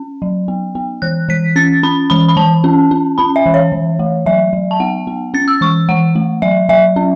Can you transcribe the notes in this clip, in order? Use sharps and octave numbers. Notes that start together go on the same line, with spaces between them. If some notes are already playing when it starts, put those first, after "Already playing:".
Already playing: C#4
F#3
B3
B3
E3 F#6
E3 B6
C#4 A6
C#4 B5
E3 B5
B5
E3 A5
C#4
C#4
C#4 B5
E5
E3
C#5
E3
A3
F#3 E5
F#3
A5
B3 F#5
B3
C#4 A6
E6
E3 C#6
E3 F#5
A3
F#3 E5
F#3 E5
C#4